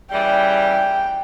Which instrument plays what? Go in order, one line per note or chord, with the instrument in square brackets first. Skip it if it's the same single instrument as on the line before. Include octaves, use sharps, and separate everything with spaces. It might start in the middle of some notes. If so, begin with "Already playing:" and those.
[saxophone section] C#3 E3 G3 [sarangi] G5